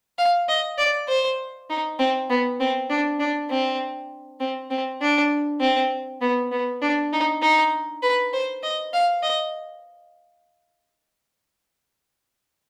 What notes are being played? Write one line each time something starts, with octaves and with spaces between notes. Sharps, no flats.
F5
D#5
D5
C5
D#4
C4
B3
C4
D4
D4
C4
C4
C4
D4
C4
B3
B3
D4
D#4
D#4
B4
C5
D#5
F5
D#5